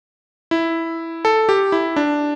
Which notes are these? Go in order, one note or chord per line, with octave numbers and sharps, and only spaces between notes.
E4
A4
G4
E4
D4